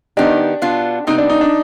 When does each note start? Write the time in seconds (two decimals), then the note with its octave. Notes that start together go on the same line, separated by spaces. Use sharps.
0.17 D#3 B3 D4 D#4 G4
0.62 B2 B3 D4 F4
1.07 C3 G3 B3 D#4
1.18 D4
1.30 D#4
1.41 D4